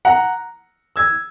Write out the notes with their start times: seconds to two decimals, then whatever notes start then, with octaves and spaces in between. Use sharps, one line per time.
0.05 F#5 A#5
0.96 E6 G#6